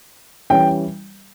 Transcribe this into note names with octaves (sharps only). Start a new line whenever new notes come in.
E3 G3 C#4 G5